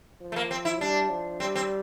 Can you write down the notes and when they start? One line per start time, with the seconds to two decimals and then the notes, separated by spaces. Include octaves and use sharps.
0.21 F3
0.32 A3
0.36 A#3
0.51 C4
0.65 E4
0.80 G3 D4
1.10 F3
1.40 G3 C4
1.56 C4